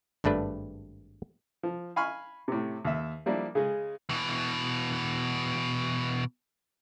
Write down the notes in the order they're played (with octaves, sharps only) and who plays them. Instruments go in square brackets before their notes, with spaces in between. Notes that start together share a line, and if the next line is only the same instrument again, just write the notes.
[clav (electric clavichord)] G#1 G2 A3 D4 B4
[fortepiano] F3
F5 G#5 B5 C#6 F6
A2 C3
D#2 E5
F3 G3 A#3 D4 E4
C#3 G#3
[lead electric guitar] B2 E3